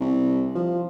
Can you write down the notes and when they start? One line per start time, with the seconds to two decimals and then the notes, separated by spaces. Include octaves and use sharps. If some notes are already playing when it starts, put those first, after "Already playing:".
0.01 C2
0.55 F3